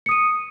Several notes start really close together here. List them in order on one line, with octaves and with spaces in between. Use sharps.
C#7 D#6 D#7